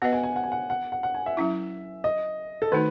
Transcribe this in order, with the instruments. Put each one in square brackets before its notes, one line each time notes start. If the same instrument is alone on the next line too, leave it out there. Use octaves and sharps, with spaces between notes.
[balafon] B3 F#4 B4 D#5 [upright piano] F#5
[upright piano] G#5
G#5
F#5
G#5
F#5
F#5
F#5
F#5
G#5
E5
[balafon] F#3 C#4 E4
[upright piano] D#5
A4
[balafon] D#3 A3 D#4 F#4 [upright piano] B4